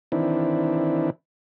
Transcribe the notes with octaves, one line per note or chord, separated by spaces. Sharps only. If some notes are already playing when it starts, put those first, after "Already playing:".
D#3 E3 C4 D4 E4